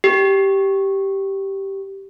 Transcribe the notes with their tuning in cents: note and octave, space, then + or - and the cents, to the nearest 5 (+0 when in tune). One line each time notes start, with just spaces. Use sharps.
G4 -10